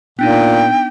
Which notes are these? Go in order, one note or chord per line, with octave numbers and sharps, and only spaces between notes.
A#2 B3 D4 D#4 G5